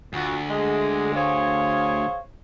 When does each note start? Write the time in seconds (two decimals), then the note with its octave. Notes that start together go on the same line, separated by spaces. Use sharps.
0.14 D2 F4 F#4
0.49 G#3 G#4
1.15 G#4 C5 C#5 F5